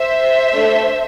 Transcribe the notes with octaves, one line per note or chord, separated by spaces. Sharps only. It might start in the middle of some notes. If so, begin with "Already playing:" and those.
Already playing: C5 E5
A3 D4 A4